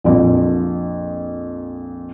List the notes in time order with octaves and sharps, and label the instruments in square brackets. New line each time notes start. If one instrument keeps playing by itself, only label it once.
[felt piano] A#1 F2